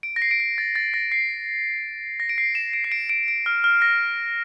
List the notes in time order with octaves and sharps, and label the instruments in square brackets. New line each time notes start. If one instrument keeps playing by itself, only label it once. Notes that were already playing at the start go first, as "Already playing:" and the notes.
[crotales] D7
A#6
C7
D7
C7
A6
A6
A#6
C7
A#6
D7
C7
E7
D7
C7
D7
D7
D7
F6
F6
A#6